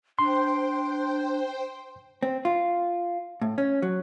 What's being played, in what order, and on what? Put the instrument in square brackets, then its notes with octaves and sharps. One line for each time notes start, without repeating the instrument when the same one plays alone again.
[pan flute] D4 [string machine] C5 G5 [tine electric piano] C6
[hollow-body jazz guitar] C4
F4
A2
C#4
F#3